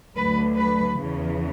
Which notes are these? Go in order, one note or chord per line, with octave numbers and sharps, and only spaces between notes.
D2 D3 F#3 B4
B4
E2 C#3 E3